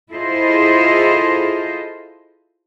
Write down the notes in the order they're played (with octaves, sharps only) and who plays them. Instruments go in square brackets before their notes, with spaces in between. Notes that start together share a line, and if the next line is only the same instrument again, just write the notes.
[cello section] E4 F4 G#4 A4 C5 D#5